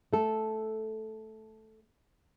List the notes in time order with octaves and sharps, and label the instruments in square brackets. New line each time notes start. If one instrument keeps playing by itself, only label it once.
[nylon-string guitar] A3 A4